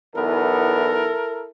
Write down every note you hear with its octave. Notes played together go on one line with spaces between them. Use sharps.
B1 E2 B3 E4 A4 A#4